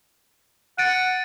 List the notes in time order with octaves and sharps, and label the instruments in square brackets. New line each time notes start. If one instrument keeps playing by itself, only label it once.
[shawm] F#5 [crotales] A6 D7 D#7